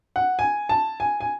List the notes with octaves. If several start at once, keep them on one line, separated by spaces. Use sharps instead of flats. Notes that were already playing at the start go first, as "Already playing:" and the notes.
F#5
G#5
A5
G#5
G#5